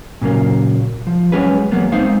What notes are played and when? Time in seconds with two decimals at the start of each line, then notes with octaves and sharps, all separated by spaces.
0.22 A#2 C#3 F#3 A#3
1.07 F3
1.32 F#3 G#3 C#4 G#4 B4
1.71 E2 F#3 A#3 B3
1.92 G#3 C4 D#4 C5 F5